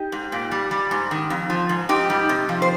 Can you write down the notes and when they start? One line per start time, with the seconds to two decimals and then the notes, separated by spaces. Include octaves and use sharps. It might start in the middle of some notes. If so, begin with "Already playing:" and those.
Already playing: D#4 G4
0.12 G#2
0.32 A#2
0.51 G3
0.71 G3
0.91 G#2
1.11 D#3
1.30 F2
1.50 F3
1.69 G#2
1.89 G#2 D#4 G4
2.10 G3
2.29 C3
2.49 F3
2.62 C5